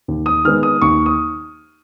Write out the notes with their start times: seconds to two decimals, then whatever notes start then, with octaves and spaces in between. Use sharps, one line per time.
0.08 D#2
0.26 D#6
0.45 D#3 G#3 B3 F6
0.63 D#6
0.82 D#2 C#6
1.06 D#6